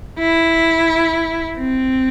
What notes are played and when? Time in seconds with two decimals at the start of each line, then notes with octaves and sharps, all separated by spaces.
0.20 E4
1.59 C4